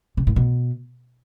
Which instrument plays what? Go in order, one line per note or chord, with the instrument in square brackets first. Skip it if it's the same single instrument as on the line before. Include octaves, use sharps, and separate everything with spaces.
[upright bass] C3
A2
B2